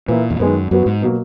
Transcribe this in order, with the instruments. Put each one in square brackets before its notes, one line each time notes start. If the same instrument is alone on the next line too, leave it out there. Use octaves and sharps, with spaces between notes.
[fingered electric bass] A#2 [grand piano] E3 A#3 E4
[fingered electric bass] E2
[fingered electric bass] F#2 [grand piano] D#3 G#3 B3
[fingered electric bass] F#2 [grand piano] F#3 B3 F#4
[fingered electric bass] G#2
[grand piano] B2 F#3 A#3